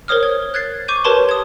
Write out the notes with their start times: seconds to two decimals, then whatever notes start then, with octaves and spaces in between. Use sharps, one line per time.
0.08 A#4 C5 C#5 D#6 F6
0.23 G#6
0.54 F#6 G#6 A6 C7
0.88 C#6 D6 G6 D#7
1.04 G4 A#4 B4 C#5 A5 C6
1.29 D#6 G#6